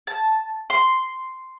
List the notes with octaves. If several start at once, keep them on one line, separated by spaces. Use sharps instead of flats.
A5
C6